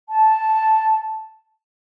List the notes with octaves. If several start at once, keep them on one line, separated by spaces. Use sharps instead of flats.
A5